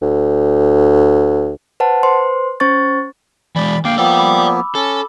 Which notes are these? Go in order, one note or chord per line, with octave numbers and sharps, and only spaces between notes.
D2
B4 C5 F#5 A5
B4 C5 C6
C#4 C5 C#6 A6
E3 G#3 D5 B5
D3 A#3 F5 G5 D6
F3 A#3 B3 D5 G5 E6
B5 D6
C#4 A4